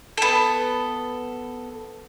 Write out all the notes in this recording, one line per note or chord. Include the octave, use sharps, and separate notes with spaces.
B3 A4